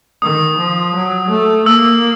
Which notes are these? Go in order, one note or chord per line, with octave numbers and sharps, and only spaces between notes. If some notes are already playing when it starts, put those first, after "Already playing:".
D#3 D#6
F3
F#3
A3
A#3 E6